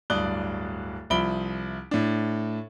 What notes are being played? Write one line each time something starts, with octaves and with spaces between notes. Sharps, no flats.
D1 G2 D5 D#6 F#6 G7
C2 F3 E5 B5 D7 G7
A2 D4